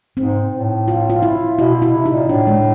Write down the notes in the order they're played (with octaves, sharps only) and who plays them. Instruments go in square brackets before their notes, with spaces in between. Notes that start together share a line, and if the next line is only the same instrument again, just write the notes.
[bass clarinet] G#2 [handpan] C4
[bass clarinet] A2
[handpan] F4
F4
E4
[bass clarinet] B2 [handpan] E4
[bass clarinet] B2
[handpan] E4
[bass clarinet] C3
[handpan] D#4
[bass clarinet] A#2
[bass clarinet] A2 [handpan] D4
[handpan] G#3